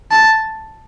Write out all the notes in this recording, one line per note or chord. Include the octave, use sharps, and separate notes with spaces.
A5